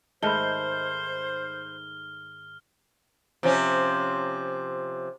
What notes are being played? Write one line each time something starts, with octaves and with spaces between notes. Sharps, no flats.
G#2 D#3 A3 C5 A5 B5 F6 G7
C3 F3 C#4